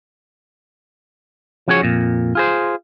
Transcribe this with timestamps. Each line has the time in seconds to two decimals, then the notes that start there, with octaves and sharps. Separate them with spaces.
1.68 F3 C#4 F#4 G#4 C#5
1.82 F2 A#2
2.35 F4 G#4 C5